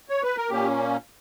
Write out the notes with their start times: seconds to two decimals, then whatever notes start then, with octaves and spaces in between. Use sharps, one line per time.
0.09 C#5
0.23 B4
0.37 A#4
0.50 A#2 A#3 C#4 G4